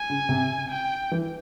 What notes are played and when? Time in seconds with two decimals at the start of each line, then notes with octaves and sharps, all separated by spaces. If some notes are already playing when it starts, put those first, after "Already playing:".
Already playing: G#5
0.10 C#3
0.29 C3
0.70 G5
1.12 E3